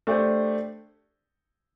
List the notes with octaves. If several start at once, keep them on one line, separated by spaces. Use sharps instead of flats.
A3 D4 G4 C5